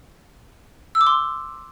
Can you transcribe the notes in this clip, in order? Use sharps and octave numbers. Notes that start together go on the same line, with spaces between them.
E6
D6
C6